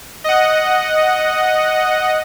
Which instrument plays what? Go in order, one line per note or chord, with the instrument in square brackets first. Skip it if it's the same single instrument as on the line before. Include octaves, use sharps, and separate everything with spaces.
[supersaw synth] D#5 F#5